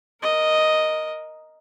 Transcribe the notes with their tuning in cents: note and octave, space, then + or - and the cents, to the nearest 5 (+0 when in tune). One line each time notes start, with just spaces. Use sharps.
A#4 +5 D#5 +0